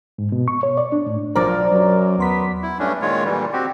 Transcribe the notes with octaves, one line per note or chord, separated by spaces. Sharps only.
G#2
B2
C#6
C#5
D5
D4
A2
B1 F3 F#3 D4 A#4 C5 D5
F#2 F#3
D#2 B3 C6 B6
E4
G2 A3 C#4 D4
A#2 D#3 G#3 F4 C#5
A#2 D3 E3 G3
C4 F#4 G4